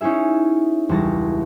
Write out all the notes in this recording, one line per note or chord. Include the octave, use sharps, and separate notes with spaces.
C#4 D#4 E4 G#4 E5
E1 C#2 G3 A6 A#6